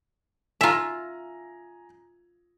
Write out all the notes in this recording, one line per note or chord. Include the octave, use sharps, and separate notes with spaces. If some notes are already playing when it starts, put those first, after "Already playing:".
F4 E5 G#5 A#5